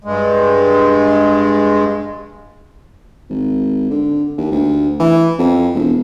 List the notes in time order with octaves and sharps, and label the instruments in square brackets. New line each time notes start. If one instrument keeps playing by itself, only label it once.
[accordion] G2 G#3
[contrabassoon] G#1
D3
D#2
D2
E3
F2
E1